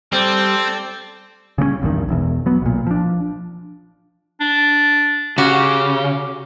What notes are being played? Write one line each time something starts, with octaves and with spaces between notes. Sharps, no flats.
G3 C4 A4 C5 D5 E6
C#3 G3 A3 C#4
A#1 E2 G2 D#3
E1 E2
F#3 B3
B1 A#2
F3 D4
D4
C#3 F#4 G4